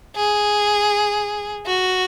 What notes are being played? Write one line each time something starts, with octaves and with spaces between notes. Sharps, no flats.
G#4
F#4